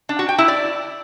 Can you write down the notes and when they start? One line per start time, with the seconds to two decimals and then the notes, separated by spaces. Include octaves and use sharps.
0.09 D4
0.19 F#4
0.29 G5
0.38 E4
0.48 D5